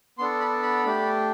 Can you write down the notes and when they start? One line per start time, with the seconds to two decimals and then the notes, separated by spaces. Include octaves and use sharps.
0.18 B3 D4 A4 C6
0.40 B5
0.63 B5
0.85 A3 D4 G4